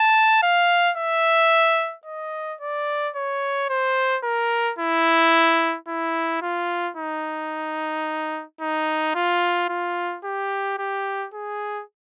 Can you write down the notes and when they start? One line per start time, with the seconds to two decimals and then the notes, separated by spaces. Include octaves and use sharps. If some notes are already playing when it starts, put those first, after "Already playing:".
Already playing: A5
0.43 F5
0.97 E5
2.06 D#5
2.61 D5
3.16 C#5
3.70 C5
4.24 A#4
4.79 E4
5.88 E4
6.42 F4
6.97 D#4
8.61 D#4
9.15 F4
9.69 F4
10.24 G4
10.78 G4
11.34 G#4